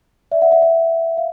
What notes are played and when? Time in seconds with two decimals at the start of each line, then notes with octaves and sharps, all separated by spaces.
0.32 D5 E5
0.42 E5 F#5
0.52 E5 F#5
0.62 E5 F#5
1.17 F5